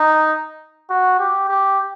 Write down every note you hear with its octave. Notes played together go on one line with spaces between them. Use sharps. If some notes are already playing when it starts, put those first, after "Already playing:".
Already playing: D#4
F#4
G4
G4